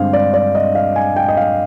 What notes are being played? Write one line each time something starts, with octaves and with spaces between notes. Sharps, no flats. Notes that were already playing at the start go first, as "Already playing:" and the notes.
Already playing: G2 D3 G#3 C4 F5
D5
D5
D#5
F5
G#5
G5
D#5
F5